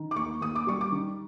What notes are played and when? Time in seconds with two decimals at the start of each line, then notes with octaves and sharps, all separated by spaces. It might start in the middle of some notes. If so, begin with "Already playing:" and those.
Already playing: D#3
0.11 D6
0.16 D#2 C#6
0.41 D#2 D#6
0.55 D6
0.67 G3 C#6
0.81 D6
0.92 D#3